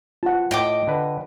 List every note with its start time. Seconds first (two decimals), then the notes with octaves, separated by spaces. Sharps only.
0.23 F4 F#5 A5
0.51 A2 D#5 G5 D6
0.87 D3 B4